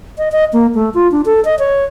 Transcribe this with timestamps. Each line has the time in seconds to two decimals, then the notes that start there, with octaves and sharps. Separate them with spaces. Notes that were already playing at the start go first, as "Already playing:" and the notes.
0.18 D#5
0.32 D#5
0.53 A#3
0.75 A3
0.94 F4
1.12 D4
1.26 A4
1.45 D#5
1.59 C#5